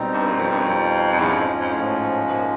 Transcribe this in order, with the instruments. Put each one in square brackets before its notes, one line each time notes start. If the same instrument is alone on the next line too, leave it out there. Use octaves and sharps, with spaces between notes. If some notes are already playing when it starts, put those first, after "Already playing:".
Already playing: [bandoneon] B2 G3 C4 D#4
[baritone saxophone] G2
F#2
F2
G2
F#2
F2
F2
[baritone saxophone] E2 [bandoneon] G#2 F3 G#3 C#4
[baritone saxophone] F2
F2
A2
B2
A#2